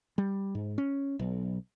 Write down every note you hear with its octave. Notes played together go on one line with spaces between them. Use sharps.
G3
G#2
C#4
B1